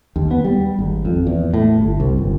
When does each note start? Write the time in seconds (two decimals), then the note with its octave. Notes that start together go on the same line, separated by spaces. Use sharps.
0.16 D#2
0.31 B3
0.44 G3
0.79 G#1
1.05 F2
1.27 E2
1.54 A2
1.78 G1
2.00 C2
2.18 G1